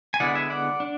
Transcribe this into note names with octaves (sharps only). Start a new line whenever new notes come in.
G#5
D3 G#3 B3 E4 D5 F#5
E5 G#5
D5 F#5
D4